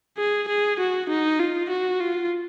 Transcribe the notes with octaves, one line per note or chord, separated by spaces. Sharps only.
G#4
G#4
F#4
D#4
F4
F#4
F4